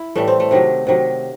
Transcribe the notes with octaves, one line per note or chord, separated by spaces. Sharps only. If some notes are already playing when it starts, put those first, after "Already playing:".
Already playing: E4
A2 E3 G3 A3
C4
A3
C3 D#3 F#3
C3 D#3 F#3